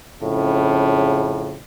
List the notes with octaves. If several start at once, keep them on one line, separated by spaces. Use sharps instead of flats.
F2 A2 C#3